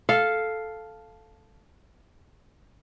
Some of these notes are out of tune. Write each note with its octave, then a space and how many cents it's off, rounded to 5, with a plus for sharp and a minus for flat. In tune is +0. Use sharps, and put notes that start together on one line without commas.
A4 -5 F5 +0